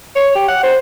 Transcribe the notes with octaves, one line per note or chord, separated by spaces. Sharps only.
C#5
G4
F#5
C5